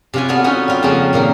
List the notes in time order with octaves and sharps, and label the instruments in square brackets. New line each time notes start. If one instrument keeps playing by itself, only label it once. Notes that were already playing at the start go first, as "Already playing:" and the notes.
[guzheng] C3 C#4 F4 B4 G#5
B3 F#4 A4 D5 F5 G#5
B3 C#4 D#4 F4 F#4
G3 F4
F2 C#3 A#3 C4 C#4
A#2 D#3 A#3 A#4